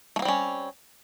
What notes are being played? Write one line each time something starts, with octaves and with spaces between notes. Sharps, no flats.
G3 A3 A#3 C4 C#4